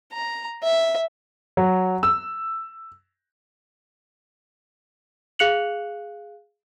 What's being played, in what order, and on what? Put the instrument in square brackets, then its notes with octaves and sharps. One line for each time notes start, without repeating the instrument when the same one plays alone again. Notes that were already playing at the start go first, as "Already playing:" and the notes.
[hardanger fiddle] A#5
E5
[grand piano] F#3
E6
[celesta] G#4 F5 F#6 C#7 F7 F#7